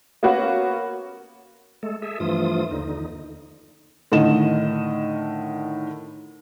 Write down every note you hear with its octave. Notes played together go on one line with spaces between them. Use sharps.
A#3 B3 C#4 F#4
G#3 A3 A4
G#4 A4 E5
G2 E3 F3 A3 F4 D#6
D#2 D3 D#4
A2 D3 D#3 D#5 E7